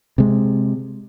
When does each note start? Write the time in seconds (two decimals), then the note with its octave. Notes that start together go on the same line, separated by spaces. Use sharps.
0.18 C3 G#3